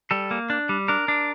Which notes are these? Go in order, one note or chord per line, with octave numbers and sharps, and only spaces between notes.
G3 A4
A#3
D4
G3
D4 A#4
D4